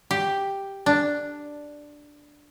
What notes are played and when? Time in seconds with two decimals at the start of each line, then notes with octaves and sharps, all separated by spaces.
0.11 G4
0.86 D4